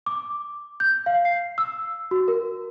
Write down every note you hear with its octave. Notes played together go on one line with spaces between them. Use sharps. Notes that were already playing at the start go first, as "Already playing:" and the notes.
D6
G6
F5
C7
E6
F#4
A#4